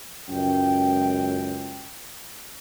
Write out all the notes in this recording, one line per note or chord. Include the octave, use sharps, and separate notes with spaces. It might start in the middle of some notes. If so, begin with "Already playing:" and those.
C#2 F#2 G5